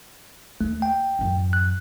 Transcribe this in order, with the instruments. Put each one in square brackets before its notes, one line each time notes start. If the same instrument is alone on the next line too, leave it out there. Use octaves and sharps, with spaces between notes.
[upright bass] D#2 [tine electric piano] A3
[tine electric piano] G5
[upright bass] A1 F#2
[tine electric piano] F#6